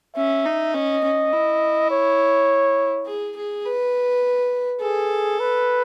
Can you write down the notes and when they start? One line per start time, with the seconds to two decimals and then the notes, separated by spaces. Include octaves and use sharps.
0.16 C#4 E5
0.45 D#4
0.74 C#4 D#5
1.04 C#4
1.32 E4
1.91 C#5
3.07 G#4
3.36 G#4
3.65 B4
4.81 G#4 A4
5.40 B4